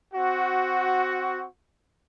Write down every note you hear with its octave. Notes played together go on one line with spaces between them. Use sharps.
C4 F#4